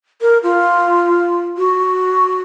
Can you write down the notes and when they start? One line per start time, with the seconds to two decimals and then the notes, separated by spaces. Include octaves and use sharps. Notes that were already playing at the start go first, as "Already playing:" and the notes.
0.22 A#4
0.43 F4
1.57 F#4